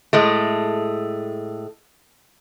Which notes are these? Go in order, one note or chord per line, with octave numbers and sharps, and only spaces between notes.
A2 G#3 A3